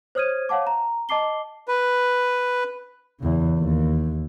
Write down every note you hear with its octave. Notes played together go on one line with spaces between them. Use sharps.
C5 C#5 D#6 F6 G#6 D#7
C#5 F5 F#5 A5 D6
A#5
D#5 A5 D6 C7 G7
B4
E2 C#3
D#2